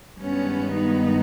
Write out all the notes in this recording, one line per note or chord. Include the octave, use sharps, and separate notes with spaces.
G2 D#3 G#3 B3 C#4
D#4